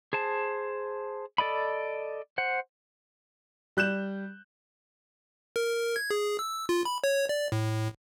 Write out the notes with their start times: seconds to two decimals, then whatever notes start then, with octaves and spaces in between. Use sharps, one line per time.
0.13 G#4 C5 A5
1.38 A4 D5 D#5 B5
2.38 C5 F#5
3.77 G3 F#6 G6 E7
5.56 A#4
5.96 G#6
6.10 G#4
6.39 E6
6.69 F4
6.85 B5
7.04 C#5
7.29 D5
7.52 A2